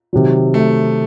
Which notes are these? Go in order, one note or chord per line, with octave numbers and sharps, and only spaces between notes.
C3 D#3 F#3
A3